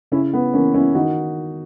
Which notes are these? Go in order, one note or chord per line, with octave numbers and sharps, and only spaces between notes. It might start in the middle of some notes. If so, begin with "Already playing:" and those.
C#3 C#4 E4
B3
E3 A#3 C#4
C#4 E4
D#3 D#4 F#4